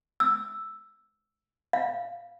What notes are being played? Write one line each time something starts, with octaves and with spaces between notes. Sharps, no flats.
E6
F5